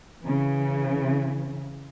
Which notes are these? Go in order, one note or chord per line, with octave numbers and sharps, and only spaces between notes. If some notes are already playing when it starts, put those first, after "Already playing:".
C#3 E3